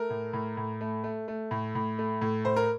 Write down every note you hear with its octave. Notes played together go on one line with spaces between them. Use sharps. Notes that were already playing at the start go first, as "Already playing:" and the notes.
Already playing: A3 A#4
A2
A2
A2
A3
A3
A3
A2
A2
A3
A2
A2 C5
A#4